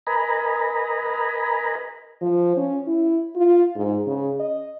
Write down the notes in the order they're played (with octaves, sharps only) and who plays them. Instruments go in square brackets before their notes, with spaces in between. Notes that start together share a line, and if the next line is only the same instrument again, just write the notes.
[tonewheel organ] A#4 B4 D#5 G#5 A#5 B5
[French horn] F3
C#4
E4
F4
G#2
C#3
D#5